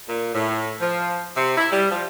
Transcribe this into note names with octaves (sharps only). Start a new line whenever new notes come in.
A#2
A2
F3
C3
E4
G3
F3